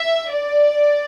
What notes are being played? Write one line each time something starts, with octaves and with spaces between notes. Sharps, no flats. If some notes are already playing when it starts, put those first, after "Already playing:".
Already playing: E5
D5